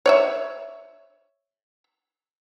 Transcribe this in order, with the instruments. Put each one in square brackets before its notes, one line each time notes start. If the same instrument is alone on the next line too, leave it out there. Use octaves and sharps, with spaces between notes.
[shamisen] C#5 D5 E5